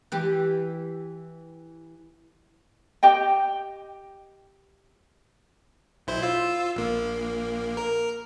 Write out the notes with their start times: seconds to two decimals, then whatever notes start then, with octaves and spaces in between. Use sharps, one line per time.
0.12 E3 G4
3.03 G4 D#5 G5
6.07 B1 E4 C5
6.22 F4 E6
6.76 A#1 A#3
7.77 A#4